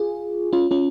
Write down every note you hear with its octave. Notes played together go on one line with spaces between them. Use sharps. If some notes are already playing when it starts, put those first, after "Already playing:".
Already playing: F4 G#4
C#4 F4
C#4 F4